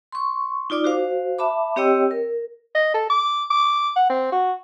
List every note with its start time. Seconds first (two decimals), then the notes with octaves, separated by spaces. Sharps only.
0.12 C6 C#6
0.70 D#4 F4 D5 D6
0.84 F#4 C5 F5
1.38 E5 A5 B5 D6
1.76 C4 G4 C#5 D#5 G5 E6
2.11 A#4
2.75 D#5
2.94 A4
3.10 D6
3.50 D6
3.96 F#5
4.10 C4
4.32 F#4